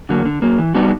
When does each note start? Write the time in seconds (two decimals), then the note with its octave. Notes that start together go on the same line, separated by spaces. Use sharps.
0.09 D3 F#3 A#3
0.25 D3
0.42 F#3 A#3
0.58 E3
0.75 G3 B3 D#4 F#4